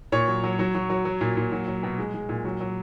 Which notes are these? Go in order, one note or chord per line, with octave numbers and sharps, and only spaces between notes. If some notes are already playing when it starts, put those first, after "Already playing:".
A#2 C#5
F#3
F#3
F#3
F#3
F#3
F#3
A#2
A#2
F#3
F#3
B2
G#3
G#3
A#2
F#3
F#3